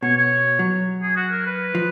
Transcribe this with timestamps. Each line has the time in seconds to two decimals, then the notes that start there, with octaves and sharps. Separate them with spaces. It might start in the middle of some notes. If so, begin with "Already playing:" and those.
0.03 B2 C#5
0.16 C#5
0.59 F#3
1.02 G#4
1.16 F#4
1.31 A#4
1.46 B4
1.75 F3